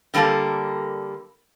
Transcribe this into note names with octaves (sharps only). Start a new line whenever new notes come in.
D3 G3 A#3 A4 A#4